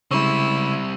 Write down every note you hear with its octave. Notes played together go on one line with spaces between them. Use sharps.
C#3 G3 G#3 C4 E4 C#6 E6